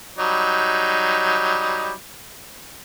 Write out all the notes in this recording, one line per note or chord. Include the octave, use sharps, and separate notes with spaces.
F#3 G3 D#4